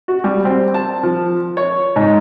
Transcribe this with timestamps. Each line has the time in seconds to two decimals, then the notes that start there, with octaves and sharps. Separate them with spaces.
0.08 F#4
0.24 G3
0.45 C4
0.74 A5
1.03 F3
1.57 C#5
1.96 G#2